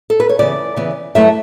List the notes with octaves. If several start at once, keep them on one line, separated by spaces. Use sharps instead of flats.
A4
B4
C#5
C#3 E3 B3 D5
C#3 E3 B3
G2 F#3 A3 E4 E5